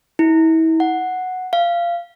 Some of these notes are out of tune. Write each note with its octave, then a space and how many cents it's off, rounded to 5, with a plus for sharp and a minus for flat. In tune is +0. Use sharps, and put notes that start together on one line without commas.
E4 -35
F#5 -5
F5 -20